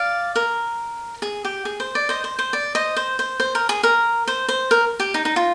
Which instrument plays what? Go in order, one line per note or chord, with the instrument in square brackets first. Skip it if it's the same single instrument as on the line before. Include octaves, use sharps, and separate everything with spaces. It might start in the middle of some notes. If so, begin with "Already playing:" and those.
Already playing: [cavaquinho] D5 F5
A#4
G#4
G4
G#4
C5
D5
C5 D#5
C5
C5
D5
C5 D#5
C5
C5
C5
A#4
G#4
A#4
C5
C5
A#4
G4
D#4
D#4
F4